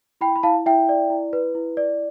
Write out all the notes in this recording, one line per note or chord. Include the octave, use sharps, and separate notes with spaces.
E4 G5 B5
B5
E4 F5 A5
E4 E5 G5
D5
E4
B4
E4
D5